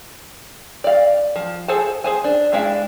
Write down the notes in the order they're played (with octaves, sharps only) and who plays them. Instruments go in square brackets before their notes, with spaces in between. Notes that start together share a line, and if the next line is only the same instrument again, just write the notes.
[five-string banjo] D5 F5
F3
G#4 A4 C5 G#5 A5
G#4 C5 G#5
D4
G#3 D4 E4 F5